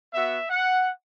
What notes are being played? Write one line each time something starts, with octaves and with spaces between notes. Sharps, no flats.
B3 F#4 E5
F#5